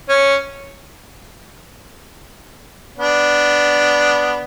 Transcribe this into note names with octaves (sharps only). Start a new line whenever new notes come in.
C#4
B3 D4